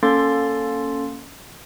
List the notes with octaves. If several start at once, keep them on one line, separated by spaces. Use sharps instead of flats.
A#3 C#4 A4 C6 A6